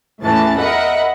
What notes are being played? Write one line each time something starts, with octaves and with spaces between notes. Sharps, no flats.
E2 A2 E3 C#4 A5 A6
A#4 D#5 E5 F#5 B5